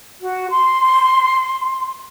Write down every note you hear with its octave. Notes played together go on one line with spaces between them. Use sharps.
F#4
C6